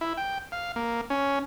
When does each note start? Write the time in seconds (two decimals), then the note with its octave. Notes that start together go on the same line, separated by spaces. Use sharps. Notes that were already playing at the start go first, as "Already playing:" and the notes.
0.01 E4
0.17 G5
0.52 F5
0.76 A#3
1.10 C#4